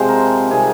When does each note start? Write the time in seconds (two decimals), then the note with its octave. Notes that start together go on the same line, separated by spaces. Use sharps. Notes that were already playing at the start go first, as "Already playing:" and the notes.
Already playing: C3 F3 G#3 C5
0.09 A#4
0.51 C3 D#3 G3 G#4